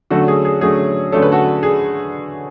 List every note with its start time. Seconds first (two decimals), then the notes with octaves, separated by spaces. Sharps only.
0.10 D3 F#3 A3 C#4 F#4 A4
0.28 G#4
0.45 G#4
0.61 D3 F#3 A3 C#4 G#4
1.12 D3 F#3 A3 C#4 A4
1.22 B4
1.32 F#4 A4
1.63 G#4